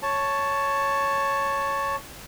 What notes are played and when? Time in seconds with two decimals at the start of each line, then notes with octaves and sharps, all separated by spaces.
0.03 C#5 A5